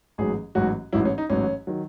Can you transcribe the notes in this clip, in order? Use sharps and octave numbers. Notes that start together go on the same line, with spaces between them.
A1 G#2 F#3 G#4
A1 G#2 F#3 F#4
A1 G#2 F#3 E4
C#4
D#4
A1 G#2 F#3 C#4
D#3 F#3